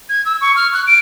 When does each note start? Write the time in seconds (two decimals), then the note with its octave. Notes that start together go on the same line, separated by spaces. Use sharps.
0.09 G#6
0.26 E6
0.41 C#6
0.56 F6
0.74 F#6
0.87 D7